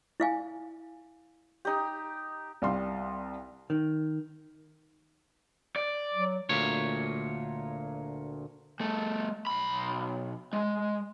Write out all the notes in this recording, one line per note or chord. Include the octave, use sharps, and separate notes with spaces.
E4 F5 G#5
D#4 G4
C2 G3 F5 C6
D#3
D5
F#3
D2 A#2 C#5
G3 A3
B1 B5
G#3